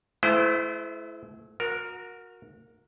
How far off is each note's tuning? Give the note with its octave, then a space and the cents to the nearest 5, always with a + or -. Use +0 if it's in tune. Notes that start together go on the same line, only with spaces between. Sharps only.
A3 -40 E4 +10 C5 -35
F#4 -30 A#4 +0